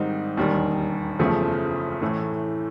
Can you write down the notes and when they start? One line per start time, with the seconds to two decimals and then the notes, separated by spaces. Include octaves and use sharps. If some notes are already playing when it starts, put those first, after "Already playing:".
Already playing: G#2 D#3 G3 C4 D#4
0.37 E1 D#2 D#3 G3
1.19 F#1 E2 C#3 F3 A3
2.02 A2 E3 A3